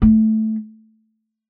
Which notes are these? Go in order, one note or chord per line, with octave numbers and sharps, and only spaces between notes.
A3